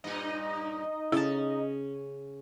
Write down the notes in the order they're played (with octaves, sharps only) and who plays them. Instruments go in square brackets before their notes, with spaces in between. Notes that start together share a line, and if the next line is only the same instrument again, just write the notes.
[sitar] G2 A#2 [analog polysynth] D#4 D#5
[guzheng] C#3 A5 [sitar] C#4 [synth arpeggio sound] E4